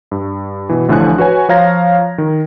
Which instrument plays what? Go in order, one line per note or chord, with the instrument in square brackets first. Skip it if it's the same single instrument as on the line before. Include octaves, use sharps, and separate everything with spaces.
[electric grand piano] G2
B2 E3
A1 A2 D3 F3 G#5 F#6
F#4 B4 C#5 G#5
F3 C#5 F5 A#5 G#6 A#6
D#3